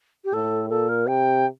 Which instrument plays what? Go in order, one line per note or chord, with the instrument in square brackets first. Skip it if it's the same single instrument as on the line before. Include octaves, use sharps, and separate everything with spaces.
[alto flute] G4
[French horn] A2 [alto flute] A4
[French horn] A#2 [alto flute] A4
[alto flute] A#4
[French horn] C3 [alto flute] G5